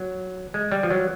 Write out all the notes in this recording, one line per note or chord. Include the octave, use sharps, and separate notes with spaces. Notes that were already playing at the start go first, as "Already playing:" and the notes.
Already playing: F#3
G#3
G3
F3
F#3